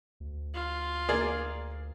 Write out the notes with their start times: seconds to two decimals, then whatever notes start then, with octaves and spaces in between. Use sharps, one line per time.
0.20 D2
0.54 F4
1.09 A#3 G#4 D5